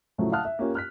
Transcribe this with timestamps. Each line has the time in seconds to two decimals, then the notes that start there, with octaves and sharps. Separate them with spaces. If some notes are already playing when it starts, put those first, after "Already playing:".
0.18 A2 C#3 F3 F#3 A3
0.32 F5 F#5 A5 D#6 F6 F#6
0.45 E5
0.59 A#3 C#4 F4 G4
0.75 F6 F#6 B6